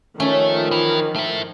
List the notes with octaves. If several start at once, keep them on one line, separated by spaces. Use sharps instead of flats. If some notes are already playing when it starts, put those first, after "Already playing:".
D#3 F3 A3 C#4
E3
A3 E4